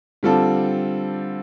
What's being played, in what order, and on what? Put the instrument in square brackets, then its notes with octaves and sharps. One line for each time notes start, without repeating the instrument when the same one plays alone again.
[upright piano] D3 G3 C4 F4 A4